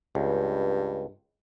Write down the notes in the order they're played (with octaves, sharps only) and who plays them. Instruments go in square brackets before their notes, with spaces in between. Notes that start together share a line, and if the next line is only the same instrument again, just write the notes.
[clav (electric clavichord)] C#2 [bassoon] G2